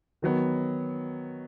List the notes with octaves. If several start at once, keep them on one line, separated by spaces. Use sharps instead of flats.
D#3 F#3 B3